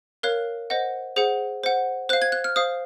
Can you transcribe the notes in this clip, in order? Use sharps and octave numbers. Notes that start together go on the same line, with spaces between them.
A#4 C#5 F5 F#6
C5 D#5 F#5
G#4 C5 F#5
C5 F#5
C5 F5 F#6
G#6
F#6
F6
C5 F5 D#6